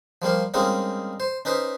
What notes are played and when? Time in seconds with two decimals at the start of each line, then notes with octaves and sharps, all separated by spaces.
0.22 F3 G3 A#3 C5
0.54 G3 G#3 A#3 C4 C#4 D#4
1.20 C5
1.45 C#4 D#4 B4 C5